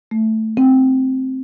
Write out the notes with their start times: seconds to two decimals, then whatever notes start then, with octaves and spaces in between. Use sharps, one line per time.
0.11 A3
0.57 C4